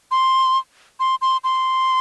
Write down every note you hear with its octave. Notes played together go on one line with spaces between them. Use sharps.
C6
C6
C6
C6